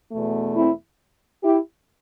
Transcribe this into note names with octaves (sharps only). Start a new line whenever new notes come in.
E2 B2 A3
C4 E4
E4 G4